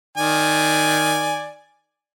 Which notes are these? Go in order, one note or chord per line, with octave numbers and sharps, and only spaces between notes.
D#3 D5 G#5